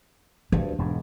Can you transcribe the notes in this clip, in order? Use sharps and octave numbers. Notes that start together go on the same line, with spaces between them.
D2 G2 D4
E1 G#2